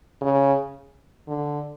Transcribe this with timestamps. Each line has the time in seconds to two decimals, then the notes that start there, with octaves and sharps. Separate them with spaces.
0.21 C#3
1.28 D3